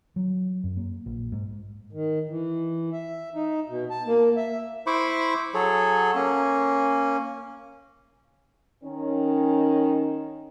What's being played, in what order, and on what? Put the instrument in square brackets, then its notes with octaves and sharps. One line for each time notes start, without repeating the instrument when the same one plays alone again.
[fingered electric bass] F#3
F#2
A#3
A#1
G#2
[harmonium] D#3
E3
E5
D#4
B2
A5
A#3
E5
[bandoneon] E4 C5 B5 C#6 D6
F#3 G#4 A4 C#5
A#3 C#4
[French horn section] D#3 C#4